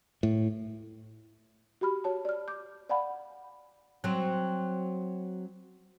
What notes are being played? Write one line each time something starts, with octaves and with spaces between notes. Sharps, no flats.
A2
F#4 G4 B5 F6
F#4 C#5 A5
D5 F6
D6 G6
D5 F5 F#5 G#5 B5
F#3 C4